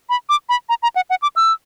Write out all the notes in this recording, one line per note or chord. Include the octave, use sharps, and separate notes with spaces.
B5
D6
B5
A#5
A#5
F#5
F#5
D6
E6